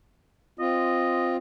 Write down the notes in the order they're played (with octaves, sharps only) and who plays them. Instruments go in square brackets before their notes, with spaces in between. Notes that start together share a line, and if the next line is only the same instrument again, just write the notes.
[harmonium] C4 F4 [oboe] D#5